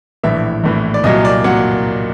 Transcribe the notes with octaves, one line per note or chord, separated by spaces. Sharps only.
A#1 A2 E3 E5
A#1 A2 E3
D5
C2 A#2 F#3 D#5
D5
A#2 F#3 F#5